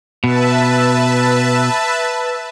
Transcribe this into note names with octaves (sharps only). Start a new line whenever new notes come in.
B2 B4 E5 A5